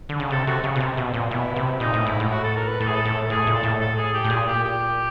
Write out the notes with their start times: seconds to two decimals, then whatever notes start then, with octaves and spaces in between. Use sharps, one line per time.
0.09 D3
0.20 C#3
0.30 C3 A4
0.47 C3 F#4
0.64 C#3
0.76 B2
0.80 C3
0.97 B2
1.14 A#2
1.31 B2 E4
1.56 C3
1.80 A#2 D#4
1.94 A2
1.99 D#4
2.06 G#2 E4
2.20 A2
2.31 F#4
2.43 A4
2.56 A#4
2.67 B4
2.80 A2 A4
2.88 G#4
2.95 A4
3.05 A2
3.30 A2 G#4
3.47 A#2
3.55 A4
3.63 A2
3.80 A4
3.98 G#4
4.14 G4
4.25 A2
4.30 A#2 G#4
4.48 G4
4.64 G4